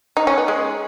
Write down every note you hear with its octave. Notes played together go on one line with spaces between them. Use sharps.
D#4
C#4
B3
G#3